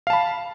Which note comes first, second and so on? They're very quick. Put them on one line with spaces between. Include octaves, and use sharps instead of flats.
F5 A5 B5